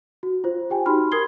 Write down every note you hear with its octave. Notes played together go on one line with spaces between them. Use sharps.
F#4
F4 C5
G4 G5 G#5
D#4 F#4 G4 B5 C6 F6
A#4 C6 D#6 G#6 C7 G7